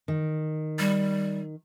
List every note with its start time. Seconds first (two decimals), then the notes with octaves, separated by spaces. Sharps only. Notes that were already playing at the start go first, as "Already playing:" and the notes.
0.08 D#3
0.79 G3